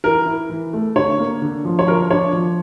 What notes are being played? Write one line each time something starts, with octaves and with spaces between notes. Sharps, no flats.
E3 A#4
E4
E3
A3
D3 C#5
A#3
D3
F3
C#5
F3 A#4
D4 C#5
F3